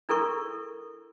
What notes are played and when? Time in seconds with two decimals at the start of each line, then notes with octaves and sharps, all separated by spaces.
0.09 D4 E4 A4 A#4 C#6